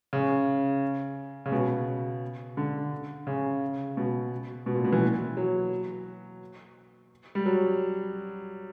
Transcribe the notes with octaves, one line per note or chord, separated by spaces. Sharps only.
C#3
C#3
B2
D3
C#3
B2
B2
A#2
B2
E3
F#3
G3
F#3